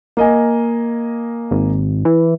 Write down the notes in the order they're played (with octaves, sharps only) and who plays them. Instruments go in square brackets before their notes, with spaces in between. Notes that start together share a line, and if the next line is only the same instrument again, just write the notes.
[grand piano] A#3 D#5 G#5
[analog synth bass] G#1
E3